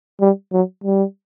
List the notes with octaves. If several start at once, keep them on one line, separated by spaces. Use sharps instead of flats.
G3
F#3
G3